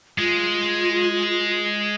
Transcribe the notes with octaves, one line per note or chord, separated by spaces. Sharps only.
G#3 F4